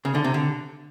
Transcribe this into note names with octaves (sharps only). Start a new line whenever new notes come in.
C#3
D3
C3
D3